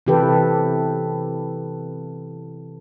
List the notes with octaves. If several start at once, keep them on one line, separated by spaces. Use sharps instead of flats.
C3 E3 G4 A4 B4